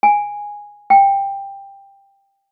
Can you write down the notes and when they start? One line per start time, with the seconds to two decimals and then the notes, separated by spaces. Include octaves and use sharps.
0.03 G#5
0.90 G5